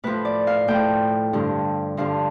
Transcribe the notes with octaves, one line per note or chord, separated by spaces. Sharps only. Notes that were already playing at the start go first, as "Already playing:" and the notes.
A2 F3 B4
D5
F5
A2 F3 G5
G2 D3 F3
G2 D3 F3 F5